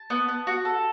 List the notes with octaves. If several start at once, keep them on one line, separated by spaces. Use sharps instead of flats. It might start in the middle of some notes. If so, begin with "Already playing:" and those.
Already playing: A5
B3
B3
F#4
A4